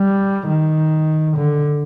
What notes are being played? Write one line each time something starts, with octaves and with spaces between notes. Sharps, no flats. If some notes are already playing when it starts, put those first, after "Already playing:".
Already playing: G3
D#3
D3